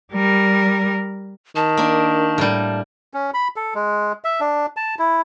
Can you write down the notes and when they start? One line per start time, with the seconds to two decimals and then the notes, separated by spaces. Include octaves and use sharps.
0.13 G3 A#4
1.56 D#3 A5
1.77 A#3 D4
2.38 A2 G3 A#4
3.14 C#4
3.34 B5
3.56 A4
3.75 G#3
4.24 E5
4.40 D4
4.77 A5
4.99 E4